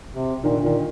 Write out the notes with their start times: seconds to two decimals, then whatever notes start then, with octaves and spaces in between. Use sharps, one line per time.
0.13 C3
0.43 A#2 D#3
0.54 D3
0.63 A#2 D#3